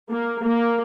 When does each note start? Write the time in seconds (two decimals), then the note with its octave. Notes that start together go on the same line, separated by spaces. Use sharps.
0.10 A#3
0.44 A#3